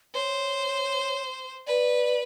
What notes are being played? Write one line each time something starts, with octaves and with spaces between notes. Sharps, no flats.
C5 C#5
B4 D5